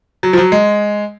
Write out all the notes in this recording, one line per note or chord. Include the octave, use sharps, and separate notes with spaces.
F#3
F3
F#3
G#3